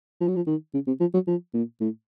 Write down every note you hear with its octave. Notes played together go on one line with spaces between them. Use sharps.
F3
F#3
F3
D#3
C#3
C3
F3
F#3
F3
A#2
A2